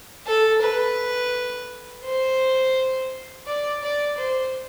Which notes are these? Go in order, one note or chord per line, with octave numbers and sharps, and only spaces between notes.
A4
B4
C5
D5
D5
C5